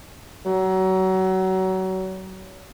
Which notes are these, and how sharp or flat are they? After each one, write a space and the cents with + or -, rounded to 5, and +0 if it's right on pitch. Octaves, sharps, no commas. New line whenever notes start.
F#3 +30